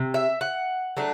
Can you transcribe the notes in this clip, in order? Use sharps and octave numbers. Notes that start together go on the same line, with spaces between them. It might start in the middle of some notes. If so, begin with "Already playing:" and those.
Already playing: C3
E5
F#5
F#3 A3 D4